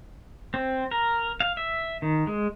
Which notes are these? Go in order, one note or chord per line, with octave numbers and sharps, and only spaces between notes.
C4
A#4
F5
E5
D#3
G#3